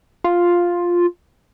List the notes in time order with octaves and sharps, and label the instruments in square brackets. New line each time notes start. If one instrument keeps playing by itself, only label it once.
[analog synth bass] F4